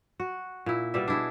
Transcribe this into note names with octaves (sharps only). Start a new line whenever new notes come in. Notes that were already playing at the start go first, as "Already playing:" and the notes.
F#4
A#2 E4
B2 G3 D5 E5
D4 E4 G#4